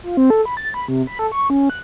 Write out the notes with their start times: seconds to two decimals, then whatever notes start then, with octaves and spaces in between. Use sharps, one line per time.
0.03 F4
0.17 C4
0.30 A4
0.45 B5
0.57 A6
0.74 B5
0.88 C3
1.07 B5
1.19 A4
1.32 C#6
1.50 C#4
1.70 F#6